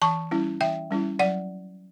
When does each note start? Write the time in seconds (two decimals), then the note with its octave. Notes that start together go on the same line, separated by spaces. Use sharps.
0.02 E3 A5 C#6
0.31 G3 C#4 E4
0.61 E3 E5 G5
0.91 G3 C#4 E4
1.19 F#3 D5 F#5